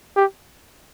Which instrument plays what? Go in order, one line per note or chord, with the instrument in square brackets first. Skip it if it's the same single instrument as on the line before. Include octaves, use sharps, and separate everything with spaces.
[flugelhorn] G4